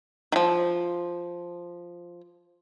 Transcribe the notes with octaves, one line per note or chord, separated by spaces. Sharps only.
D#3 F3